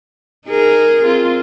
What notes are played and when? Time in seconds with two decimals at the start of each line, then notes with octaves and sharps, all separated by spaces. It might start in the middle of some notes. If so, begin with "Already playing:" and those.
0.47 D#4 G#4 A#4
1.05 C4 F4